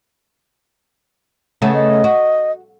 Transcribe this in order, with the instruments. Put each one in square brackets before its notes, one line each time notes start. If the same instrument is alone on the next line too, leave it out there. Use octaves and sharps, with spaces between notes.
[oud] C#3 A3 B3
[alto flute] D#5
[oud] F#4